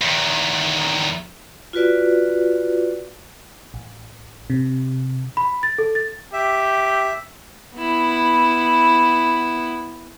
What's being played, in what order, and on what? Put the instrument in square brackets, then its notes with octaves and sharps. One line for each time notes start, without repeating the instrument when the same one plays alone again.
[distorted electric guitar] E2 D#3
[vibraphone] F4 F#4 B4 D5
[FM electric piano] A1
C3
[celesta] B5
A6
A4
A6
[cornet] G4 [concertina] E5
[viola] B3 E4